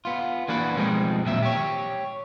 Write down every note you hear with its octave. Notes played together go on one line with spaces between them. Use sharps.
B3 F4
E3 A#3 D4 F#4 B4
B2 F3 G3 G#3 C4 D#4
A#2 D#3 F#3 C4 E5
G4 C#5